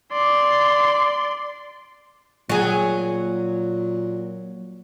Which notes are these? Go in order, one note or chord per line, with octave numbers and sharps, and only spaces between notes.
D5 C6
A#2 F#3 G#4